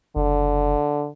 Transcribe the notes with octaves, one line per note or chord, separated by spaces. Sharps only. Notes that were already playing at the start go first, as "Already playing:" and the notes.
F#1 D3